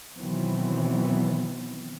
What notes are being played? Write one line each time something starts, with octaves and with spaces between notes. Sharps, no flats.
B2 D#3 E3 F#3 B3 C4